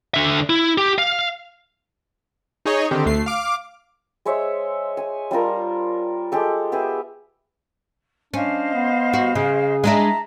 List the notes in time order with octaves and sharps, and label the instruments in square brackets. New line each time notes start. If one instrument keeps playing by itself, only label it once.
[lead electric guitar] D3 E5
E4
G4
F5
[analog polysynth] D#4 G#4 C#5 D#5
D3 D#3 C4 G4
D2 A3 C7
F5 D6
[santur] G#3 C5 C#5 E5
G#5
G3 D4 F4 A#4
G#3 G4 A4
B3 G4 G#4 E5
[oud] C#4 [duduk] D4 [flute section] C5 D#5 F5
[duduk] B3
[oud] F#4
[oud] C#3 [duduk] G#4
[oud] G#3 D4 E4 [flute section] E5 A5 A#5